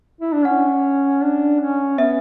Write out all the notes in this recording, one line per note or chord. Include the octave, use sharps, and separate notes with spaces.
E4
D4
C#4 F#5
D4
C#4
B3 E5